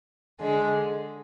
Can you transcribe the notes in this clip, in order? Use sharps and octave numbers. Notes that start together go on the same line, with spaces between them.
D3 G#3 D4